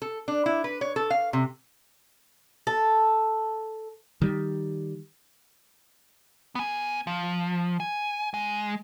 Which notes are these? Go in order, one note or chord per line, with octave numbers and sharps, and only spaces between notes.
A4
D4
E4
B4
C#5
A4
F5
C3
A4
D#3 G3
B3 G#5
F3
G#5
G#3